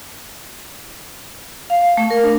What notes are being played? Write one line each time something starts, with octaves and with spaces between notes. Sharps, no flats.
F5
A3
A#4
D4